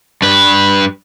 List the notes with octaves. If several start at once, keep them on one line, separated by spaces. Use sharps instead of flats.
G2 B4